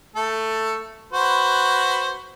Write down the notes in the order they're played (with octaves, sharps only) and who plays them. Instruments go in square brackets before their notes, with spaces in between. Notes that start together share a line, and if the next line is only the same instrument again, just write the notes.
[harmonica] A3 A4
F#4 B4 C5